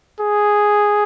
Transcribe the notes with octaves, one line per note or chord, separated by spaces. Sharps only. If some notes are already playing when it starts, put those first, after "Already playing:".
G#4